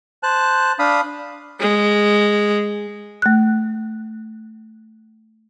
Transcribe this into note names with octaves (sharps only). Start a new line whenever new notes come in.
C5 A5 F#6
D4 F5 B5 D#6
G#3
A3 F#6